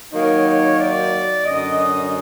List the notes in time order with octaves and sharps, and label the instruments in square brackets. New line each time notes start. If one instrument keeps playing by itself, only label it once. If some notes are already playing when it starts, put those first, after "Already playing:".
[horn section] D#3 F#3 A#3 D#4 C#5
D5
F#2 D3 F#3 D#5